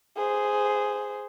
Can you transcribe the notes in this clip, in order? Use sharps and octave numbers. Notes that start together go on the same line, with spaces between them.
G#4 C5